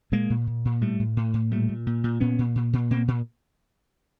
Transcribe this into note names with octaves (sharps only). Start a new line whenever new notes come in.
A#2 G#3 A#3
A#2
A#2
A#2
A2 G3 A3
A2
A2
A2
A#2 G3 A3
A#2
A#2
A#2
A#2 B3 C#4
A#2
A#2
A#2
A#2 A#3 C4
A#2